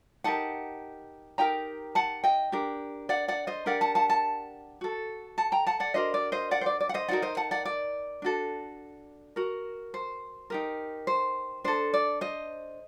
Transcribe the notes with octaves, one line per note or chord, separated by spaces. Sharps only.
D#4 G4 A#4 F#5 A5
D#4 G4 A#4 G5 A#5
F#5 A5
D#5 G5
D4 G4 A#4
D5 F#5
D5 F#5
C5 D#5
D4 G4 A#4 D5 F#5
F#5 A5
F#5 A5
F#5 A5
F#4 A4
F#5 A5
G5 A#5
F#5 A5
D5 F#5
D4 F#4 A#4 C5 D#5
D5
C5 D#5
D5 F#5
C5
D5
D5
F#5
C5 D#5
D#4 F#4 A#4 D5 F#5
C5 D#5
F#5 A5
D5 F#5
D5
D4 F#4 A4
F#4 A#4
C5
D#4 G4 A#4
C5
D4 A4 C5
D5
C5 D#5